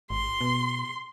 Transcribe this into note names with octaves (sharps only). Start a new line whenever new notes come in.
G#1 C6
B2